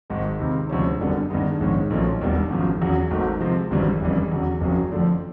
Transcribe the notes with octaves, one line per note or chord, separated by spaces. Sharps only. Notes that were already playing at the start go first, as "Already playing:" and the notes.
G#1 G#2 D#3 G#3
C#2 C3 D#3
D2 C3 F3 G#3 C#4
F#1 F#2 D3 G3 B3
G2 D#3 G#3 B3
A#1 G#2 D#3 G#3 C#4
B1 A#2 F3 A3 C#4
E1 D#2 D#3 G3 B3
G#1 F#2 C#3 F3
E2 C#3 F#3
G#1 G#2 D#3 F#3 A3
C3 F3 G#3 C4
G#1 F#2 C#3 E3 G3
F1 F2 C#3 E3 G3
E2 C#3 F#3
F#1 F2 C#3 F#3
F2 D3 F3 A3 D4